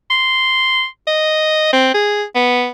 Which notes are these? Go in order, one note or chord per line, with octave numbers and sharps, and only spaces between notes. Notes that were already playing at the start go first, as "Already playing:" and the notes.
C6
D#5
C4
G#4
B3